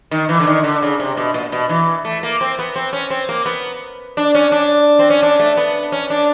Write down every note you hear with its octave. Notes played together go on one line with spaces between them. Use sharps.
D#3
E3
D3
D#3
D3
C#3
C3
B2
A#2
B2
E3
A3
A#3
C4
B3
C4
C#4
C4
A#3
B3
D4
C#4
D4
C4
C#4
D4
A3
B3
C#4
D4